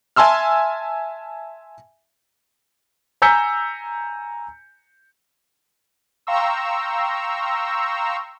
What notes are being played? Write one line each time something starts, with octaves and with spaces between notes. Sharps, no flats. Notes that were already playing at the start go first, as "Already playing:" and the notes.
E5 G#5 A5 C6 E6 F6
G#5 A#5 E6 G6 B6 C#7
F5 G5 A#5 C6 C#6 E6